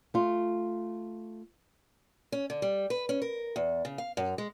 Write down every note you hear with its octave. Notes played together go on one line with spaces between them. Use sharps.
A3 F4
C#4
D3
G3
B4
C#4
A#4
E2
C#3
F5
F#2
G#3